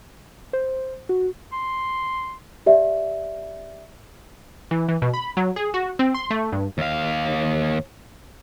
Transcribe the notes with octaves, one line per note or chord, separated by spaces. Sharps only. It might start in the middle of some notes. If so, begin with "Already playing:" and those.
C5
F#4
C6
G4 D5 E5
E3
E3
B2
B5
F#3
G#4
F#4
C4
C6
A3
G2
D#2 F5